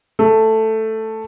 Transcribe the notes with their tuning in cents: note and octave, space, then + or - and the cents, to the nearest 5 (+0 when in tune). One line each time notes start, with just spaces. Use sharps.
A3 +5